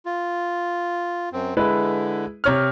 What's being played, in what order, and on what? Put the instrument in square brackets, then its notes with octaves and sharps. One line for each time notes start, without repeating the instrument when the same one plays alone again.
[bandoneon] F4
F#2 C4
[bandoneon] D3 [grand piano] G#3 E4 B4
[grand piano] C3 C#5 F6